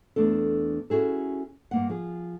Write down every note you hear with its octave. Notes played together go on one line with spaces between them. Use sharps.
E2 A3 D4 A4
C#4 E4 F#4 G#4 A4
G2 A#3 F#5
F3 G#4